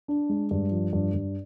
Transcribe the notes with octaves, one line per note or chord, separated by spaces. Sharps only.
D4
G#3
G2
F3
G2
G2